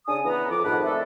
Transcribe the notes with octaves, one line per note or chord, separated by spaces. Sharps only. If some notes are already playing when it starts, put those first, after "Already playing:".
C#3 D4 G#5 D#6
E3 B3 A#5
F2 D6
F2 G#2 D#3 B4 F#5 A5
A3 C4 E4 A4 D5 E5